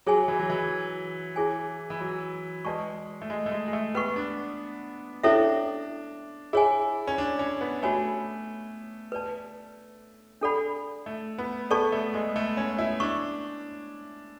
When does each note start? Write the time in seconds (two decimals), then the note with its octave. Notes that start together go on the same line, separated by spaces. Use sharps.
0.06 F#3 G#4 C#5 G#5
0.28 E3
0.39 F#3
0.50 E3
1.36 E4 G#4 C#5 G#5
1.90 E3
2.00 F#3
2.65 G#3 B4 D5 A5 C#6
3.22 A3
3.30 G#3
3.46 A3
3.51 G#3
3.68 G#3
3.73 A3
3.95 B3 B4 F#5 C#6
4.16 D4
5.23 C#4 D4 E4 A4 C#5 E5
6.53 E4 G#4 C#5 G#5
7.07 C#4
7.18 D4
7.39 C#4
7.61 B3
7.83 A3 F#4 C#5 G#5 B5
9.12 B4 D5 A5
10.41 D4 A4 D5 F#5 B5
11.06 A3
11.38 B3
11.71 B3 A4 D5 A5 C#6
11.92 A3
12.14 G#3
12.36 A3
12.57 C#4
12.78 E4
13.00 D4 C#6